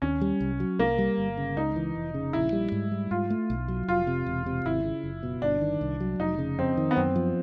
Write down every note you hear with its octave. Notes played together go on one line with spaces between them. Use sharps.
D#2 C#4
G3
C2
F#3
C2 A#3
G3
G1
C#3
C#2 D#4
E3
F1
C#3
A#1 E4
G3
G#2
G3
G#2 F4
A3
B1
F#3
F1 F4
C3
E1
C3
G#1 E4
C#3
F#1
B2
G1 D4
D#3
C2
F#3
F1 D#4
C#3
F2 C4
D#3
B3
F#2 C4
F3